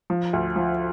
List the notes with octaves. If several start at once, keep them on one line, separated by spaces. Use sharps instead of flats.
F3
D2
F3